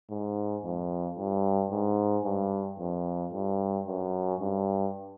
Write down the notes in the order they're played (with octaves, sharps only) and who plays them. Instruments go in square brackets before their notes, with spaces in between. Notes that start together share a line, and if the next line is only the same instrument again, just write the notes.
[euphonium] G#2
F2
G2
G#2
G2
F2
G2
F#2
G2